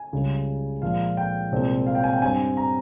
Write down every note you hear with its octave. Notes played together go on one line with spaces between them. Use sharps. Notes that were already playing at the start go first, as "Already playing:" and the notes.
Already playing: G#5
C#2 C#3 G3
A#2 F3 G#3 F5
G5
C2 A#2 G#3 C4
F5
G5
G#5
G5
G2 G3 C4 G#5
A#5